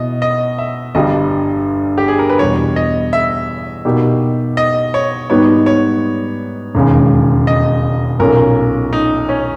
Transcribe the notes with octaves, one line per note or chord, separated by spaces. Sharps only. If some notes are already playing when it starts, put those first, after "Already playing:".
Already playing: B2 E4 D#5
D#5
E5
G1 G2 G3 D#5
G4
G#4
A#4
B4
E2 B2 G3 C#5
D#5
E5
B2 A#3 D#4 G4
D#5
C#5
G#2 G3 B3 D#4 C#5
C#5
E1 D#2 C#3 G#3
D#5
B1 A#2 A#3 C#4 A#4
D#4
C#4